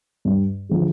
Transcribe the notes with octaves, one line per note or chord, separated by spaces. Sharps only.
G2
D3 F3 G#3